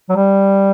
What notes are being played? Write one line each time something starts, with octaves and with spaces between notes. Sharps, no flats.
F#3
G3